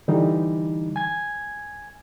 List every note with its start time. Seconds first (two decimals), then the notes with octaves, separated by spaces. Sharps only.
0.08 D3 E3 G3 D#4
0.96 G#5 G#6